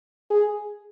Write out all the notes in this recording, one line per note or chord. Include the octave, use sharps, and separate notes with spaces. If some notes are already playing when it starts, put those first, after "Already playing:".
G#4